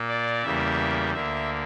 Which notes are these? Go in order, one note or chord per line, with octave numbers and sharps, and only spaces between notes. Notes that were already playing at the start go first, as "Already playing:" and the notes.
Already playing: A#2 A#3
D5
E2 C#3 G3 A#3 E5
D2 D3 A#3 E5